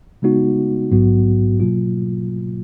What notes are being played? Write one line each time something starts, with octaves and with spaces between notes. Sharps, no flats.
C#3 G#3 B3 D#4 F#4
A#1 G#2 F#3 B3 F#4
B2 F#3 A#3 F4